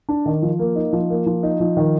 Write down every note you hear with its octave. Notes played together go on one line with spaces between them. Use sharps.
D4
D#3
F3
A#3
D#4
F3
A#3
F3
D#4
F3
D#3